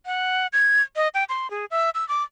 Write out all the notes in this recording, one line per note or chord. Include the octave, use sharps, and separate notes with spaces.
F#5
G#6
D#5
G5
C6
G#4
E5
E6
D6